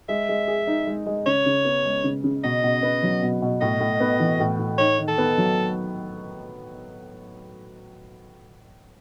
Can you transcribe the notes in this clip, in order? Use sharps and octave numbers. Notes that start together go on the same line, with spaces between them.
G#3 E5
G#3
G#4
D#4
G#3
G#3
C#3 C#5
C#3
B3
G#3
C#3
C#3
B2 D#5
B2
B3
F#3
B2
B2
A2 D#5
A2
B3
E3
A2
A2
D#4 C#5
D#3
A4
B3
F#3